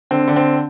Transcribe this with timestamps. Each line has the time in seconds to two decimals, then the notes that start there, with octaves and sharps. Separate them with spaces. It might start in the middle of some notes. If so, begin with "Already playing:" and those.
0.11 D3 C4
0.27 D3
0.36 C4